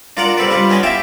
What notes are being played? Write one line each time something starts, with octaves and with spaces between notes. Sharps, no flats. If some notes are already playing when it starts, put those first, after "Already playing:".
D4 F4 A#4 D5 F#5 A#5
G3 C4 A4 B4 D5
G3 D4 F4 B4
B3 C#4 D4 D#5 G#5
E4 G4 E5 F5 G5 A5